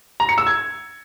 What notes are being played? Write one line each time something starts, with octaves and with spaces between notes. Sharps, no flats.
A#5
C#7
E6
G#6